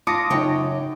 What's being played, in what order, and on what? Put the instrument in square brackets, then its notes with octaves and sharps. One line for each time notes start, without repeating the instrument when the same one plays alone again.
[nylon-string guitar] F4 [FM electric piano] A5 A#6 [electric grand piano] D6 D#6 C#7
[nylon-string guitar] F#2 C#5 G5 [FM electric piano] C#3 D#4